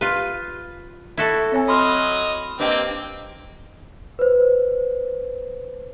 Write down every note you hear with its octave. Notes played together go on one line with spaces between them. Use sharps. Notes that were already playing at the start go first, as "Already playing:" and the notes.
F4 G4 B4 F5
E4 F#4 A4
C4 C#5 G#5
F#3 D#5 B5 C6 F6
A#3 C4 D4 G4 B4 D#5 G5
B4 C5